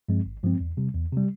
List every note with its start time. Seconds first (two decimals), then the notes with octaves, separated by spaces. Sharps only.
0.09 G2 F3 G#3 C4
0.26 G#1
0.43 G2 F3 G#3 C4
0.60 E2
0.77 C3 G3
0.95 E2
1.12 C3 G3